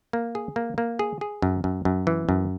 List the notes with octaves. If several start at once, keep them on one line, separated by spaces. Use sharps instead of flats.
A#3
G#4
A#3
A#3
G#4
G#4
F#2
F#2
F#2
E3
F#2